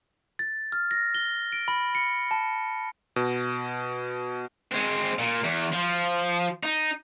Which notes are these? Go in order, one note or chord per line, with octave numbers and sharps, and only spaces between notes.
A6
F6
A#6
G7
D7
B5
C#7
A5
B2
G#3 C4
A#2
E2
F3
D#4